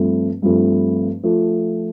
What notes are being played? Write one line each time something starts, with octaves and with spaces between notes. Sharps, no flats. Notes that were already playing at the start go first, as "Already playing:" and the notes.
Already playing: G2 F3 A3 C4
G2 F3 A3 C4
F3 A3